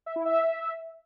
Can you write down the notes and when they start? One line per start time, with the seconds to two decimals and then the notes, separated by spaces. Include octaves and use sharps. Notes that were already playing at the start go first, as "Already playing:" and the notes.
0.06 E5
0.16 E4
0.25 E5